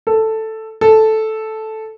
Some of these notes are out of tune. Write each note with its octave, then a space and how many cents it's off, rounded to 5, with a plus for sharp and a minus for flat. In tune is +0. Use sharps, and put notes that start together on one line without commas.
A4 +5
A4 -5